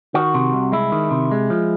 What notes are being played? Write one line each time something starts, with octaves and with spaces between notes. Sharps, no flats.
D#3 F#4
C3
C2
G#3 E4
D#3
C3
G#3
F3